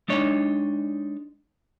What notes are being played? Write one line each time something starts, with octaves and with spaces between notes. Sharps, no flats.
G#3 D4 D#4 C#5